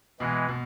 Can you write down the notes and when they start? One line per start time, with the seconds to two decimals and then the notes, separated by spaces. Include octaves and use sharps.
0.20 B2 E3 G#3
0.48 B2